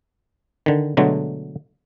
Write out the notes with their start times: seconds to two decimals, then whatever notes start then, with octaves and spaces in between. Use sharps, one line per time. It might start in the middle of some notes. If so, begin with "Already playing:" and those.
0.66 D3 D#3
0.97 B2 D3 F#3 G#3 A3